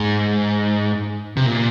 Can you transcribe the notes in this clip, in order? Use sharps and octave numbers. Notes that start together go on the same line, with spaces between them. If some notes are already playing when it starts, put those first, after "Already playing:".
Already playing: G#2
C3
A#2